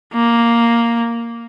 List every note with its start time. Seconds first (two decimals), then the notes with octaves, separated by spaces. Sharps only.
0.14 A#3